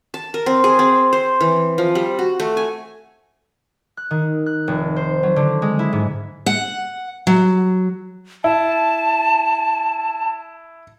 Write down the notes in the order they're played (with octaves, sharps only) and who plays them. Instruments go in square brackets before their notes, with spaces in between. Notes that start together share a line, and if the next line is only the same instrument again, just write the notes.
[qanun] A5
A#4
C4
G#4
C4
C5
E3
F3
G3
F#4
A3
G#5
[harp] F#6
D#3
F#6
F1
C5
F#3
D3
G#3
E4
G#2
[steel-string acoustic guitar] F#5
F#3
[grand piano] E4 [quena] A5